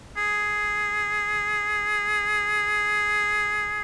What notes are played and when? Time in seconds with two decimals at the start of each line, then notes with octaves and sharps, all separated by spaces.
0.17 G#4